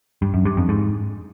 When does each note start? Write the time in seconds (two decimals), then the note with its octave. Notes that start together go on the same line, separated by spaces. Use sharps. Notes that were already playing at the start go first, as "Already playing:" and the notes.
0.22 G2
0.34 F#2
0.45 G2
0.57 F2
0.69 G#2